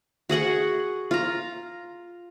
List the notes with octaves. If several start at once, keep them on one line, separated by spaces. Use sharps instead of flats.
F#4 G#4 F#5 C#6
F4 A#5